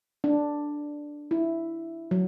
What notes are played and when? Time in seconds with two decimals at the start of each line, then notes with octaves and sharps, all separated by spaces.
0.24 D4
1.31 E4
2.11 F#3